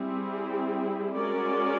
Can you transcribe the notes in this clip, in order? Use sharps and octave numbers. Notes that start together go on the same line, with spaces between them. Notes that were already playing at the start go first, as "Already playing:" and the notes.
Already playing: G3 C4 E4 G#4
G#3 C#4 F#4 A#4 D5